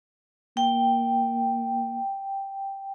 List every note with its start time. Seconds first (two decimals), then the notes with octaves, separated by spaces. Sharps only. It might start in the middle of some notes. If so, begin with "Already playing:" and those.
0.57 A#3 G5